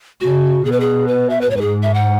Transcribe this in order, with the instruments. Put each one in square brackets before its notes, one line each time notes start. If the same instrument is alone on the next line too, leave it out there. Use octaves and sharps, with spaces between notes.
[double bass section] C#3 [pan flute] F#4
[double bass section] B2 [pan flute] G#4
[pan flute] B4
G#4
B4
E5
B4
[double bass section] G#2 [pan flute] C#5
[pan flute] B4
G#4
E5
F#5